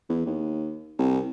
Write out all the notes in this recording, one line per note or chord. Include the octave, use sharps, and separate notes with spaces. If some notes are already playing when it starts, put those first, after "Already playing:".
E2
D#2
C2